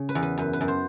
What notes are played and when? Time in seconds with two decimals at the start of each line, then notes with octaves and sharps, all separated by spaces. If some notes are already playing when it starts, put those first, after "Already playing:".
Already playing: C#3
0.09 B4
0.15 E2
0.23 B4
0.38 F#2 B4
0.53 B4
0.61 F#2
0.68 C5